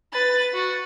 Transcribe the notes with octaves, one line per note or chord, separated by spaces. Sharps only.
B4 A6
F#4